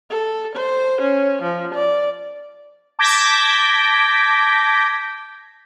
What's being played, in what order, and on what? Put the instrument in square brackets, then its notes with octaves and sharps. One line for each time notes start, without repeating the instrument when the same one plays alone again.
[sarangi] A4
C5
C#4
F3
D5
[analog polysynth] A5 D6 G6 G#6 A#6 B6